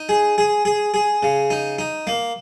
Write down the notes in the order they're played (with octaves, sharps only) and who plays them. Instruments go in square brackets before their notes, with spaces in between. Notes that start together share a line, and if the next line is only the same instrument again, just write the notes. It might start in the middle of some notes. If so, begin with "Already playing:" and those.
Already playing: [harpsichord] D#4
G#4
G#4
G#4
G#4
C#3
D#4
D#4
A#3